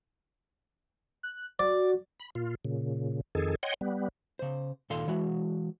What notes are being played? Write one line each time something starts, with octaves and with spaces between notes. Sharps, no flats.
F#6
F#4 D5
B5
A#2 F4
A#2 C#3
F2 D#3 G#4 A4
C#5 D#5 F#5 G5 C6
G3 B3
C#3 C5
D#2 A#2 D#3 A4 F5 C6
E3 G#3 F#4